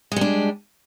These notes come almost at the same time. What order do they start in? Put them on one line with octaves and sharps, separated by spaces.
G#3 G3 D4